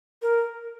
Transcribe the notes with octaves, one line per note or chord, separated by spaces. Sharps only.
A#4